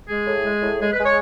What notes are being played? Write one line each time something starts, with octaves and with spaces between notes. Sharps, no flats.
G#3 G#4
A2
G#3
A2
G#3 G#4
B4
G#3
C#5